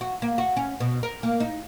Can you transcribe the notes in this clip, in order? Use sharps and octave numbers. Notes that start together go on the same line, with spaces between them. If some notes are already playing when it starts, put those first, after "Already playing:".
F#4
A#3
F#4
C#4
B2
A#4
A#3
D#4